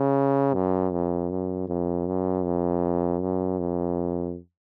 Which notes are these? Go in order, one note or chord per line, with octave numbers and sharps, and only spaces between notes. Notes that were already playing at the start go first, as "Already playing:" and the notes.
Already playing: C#3
F#2
F2
F#2
F2
F#2
F2
F#2
F2